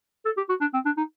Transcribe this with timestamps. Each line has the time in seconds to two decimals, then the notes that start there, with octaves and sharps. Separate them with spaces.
0.25 A4
0.37 G4
0.49 F#4
0.61 D4
0.74 C4
0.86 D4
0.97 D#4